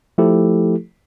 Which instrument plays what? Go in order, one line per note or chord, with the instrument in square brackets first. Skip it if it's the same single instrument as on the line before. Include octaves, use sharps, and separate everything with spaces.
[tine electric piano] F3 A3 E4 G4 A4